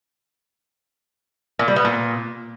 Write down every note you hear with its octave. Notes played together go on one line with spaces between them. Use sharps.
A#2
G3
B3
A#2